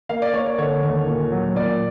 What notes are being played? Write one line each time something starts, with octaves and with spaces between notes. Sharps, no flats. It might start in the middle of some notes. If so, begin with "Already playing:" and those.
A#3 F5
D5
A#3 C#5
D5
D3 C#5
D#2
A#2
F#3
A#2 D5